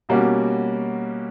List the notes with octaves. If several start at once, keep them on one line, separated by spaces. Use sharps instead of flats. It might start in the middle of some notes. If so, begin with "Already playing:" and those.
B2 G3 A#3 C#4 F#4